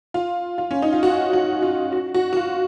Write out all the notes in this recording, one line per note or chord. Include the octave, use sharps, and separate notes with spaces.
F4
F4
C#4
D#4
F4
F#4
F#4
F4
F#4
F#4
F#4
F4